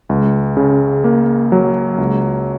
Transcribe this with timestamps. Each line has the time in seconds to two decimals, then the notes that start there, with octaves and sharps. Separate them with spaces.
0.09 C#2
0.57 C#3
1.04 A#3
1.52 F#3
1.98 C#2